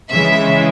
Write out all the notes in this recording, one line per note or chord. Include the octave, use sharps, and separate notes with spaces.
C#3 E3 G#3 E5